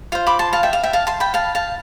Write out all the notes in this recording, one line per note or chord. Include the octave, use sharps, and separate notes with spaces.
F4 C5 F5
B5 D6
A5 C6
F5 A5
E5 G5
F5
E5 G5
F5 A5
A5 C6
G5 B5
F5 A5
F5 A5